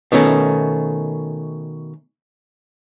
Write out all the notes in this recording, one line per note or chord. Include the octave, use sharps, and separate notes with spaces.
B2 D#3 A3 C#4